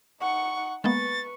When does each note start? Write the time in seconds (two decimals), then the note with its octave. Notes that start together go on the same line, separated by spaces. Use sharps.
0.21 D#4 F#5 C#6
0.84 G#3 A#3 B3 B4 C#6 A6